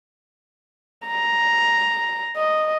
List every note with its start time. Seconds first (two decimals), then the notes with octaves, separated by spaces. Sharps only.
1.06 A#5
2.36 D#5